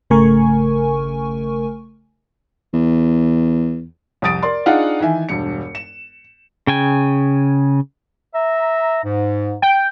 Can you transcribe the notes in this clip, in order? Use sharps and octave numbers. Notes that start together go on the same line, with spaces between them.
G#1 C#3 A3 A#4 G#5 C#6
E2
C2 F2 D#6 A6 D7
A#4 D5 C6
D4 D#4 F4 G#4 F5 F#5
D#3 E3 E5 G#5
E1 G2 C#7
E7
C#3 G5 G#5
E5 A#5
G#2
G5